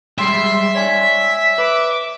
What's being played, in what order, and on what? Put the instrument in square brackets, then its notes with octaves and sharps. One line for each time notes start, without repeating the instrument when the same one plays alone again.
[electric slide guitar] G3 G#3 G5 [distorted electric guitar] E5 [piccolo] C6
[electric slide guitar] C#5 D5 G#5 [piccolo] B6
[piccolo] B6
[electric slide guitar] B4 [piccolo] D6